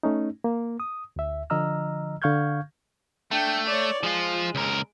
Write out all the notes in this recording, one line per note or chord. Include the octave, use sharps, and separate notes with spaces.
A3 C#4 D#4
A#3
D#6
D2 E5
D3 F3 D#5 A#5 E6 F6
D3 F5 C#6 F6 G6 G#6
A3 D4 G5
C#5 D5
F3 G#3 F4
C#2 A#4